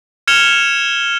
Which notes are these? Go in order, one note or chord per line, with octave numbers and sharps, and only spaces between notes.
F6 G#6 C#7 E7 F7 G7